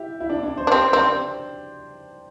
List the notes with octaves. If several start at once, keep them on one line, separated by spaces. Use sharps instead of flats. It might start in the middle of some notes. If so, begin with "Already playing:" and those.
Already playing: E4 G4
E4
D4
D4
C5
D4
C4 G4
C4 D4